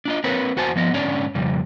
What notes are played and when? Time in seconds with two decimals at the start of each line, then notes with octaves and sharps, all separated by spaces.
0.05 D4 F4 D#5
0.24 C4 A#4 B4 C#5
0.56 E2 F#4 C5 G#5 A5
0.76 F3 B3 D#5
0.93 G#2 D3 C#4 D4 C#5 D5
1.35 F2 C#3 G3